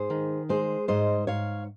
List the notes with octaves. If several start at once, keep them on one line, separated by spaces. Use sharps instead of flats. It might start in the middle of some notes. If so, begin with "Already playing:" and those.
Already playing: G#2 G#4 C5
D#3
G#3 G#4 C5
G#2 C5 D#5
G#2 C#5 F5